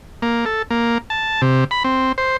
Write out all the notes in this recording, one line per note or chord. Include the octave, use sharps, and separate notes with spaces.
A#3
A4
A#3
A5
C3
B5
C4
C5